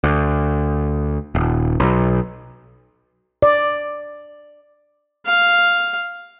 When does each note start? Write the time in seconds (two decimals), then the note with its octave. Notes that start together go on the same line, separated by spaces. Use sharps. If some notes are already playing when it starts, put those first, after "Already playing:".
0.04 D2
1.35 D#1
1.80 B1
3.42 D5
5.26 F5